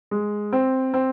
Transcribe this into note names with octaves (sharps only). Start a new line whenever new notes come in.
G#3
C4
C4